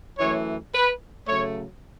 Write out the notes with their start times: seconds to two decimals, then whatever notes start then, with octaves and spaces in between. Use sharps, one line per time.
0.19 F#2 E3 A3 C#5
0.73 B4
1.27 C#3 F#3 A3 C#5